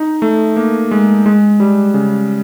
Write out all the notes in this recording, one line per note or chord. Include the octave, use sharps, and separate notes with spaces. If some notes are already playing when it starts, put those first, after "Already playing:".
Already playing: D#4
A3
A#3
G#3
G#3
G3
C#3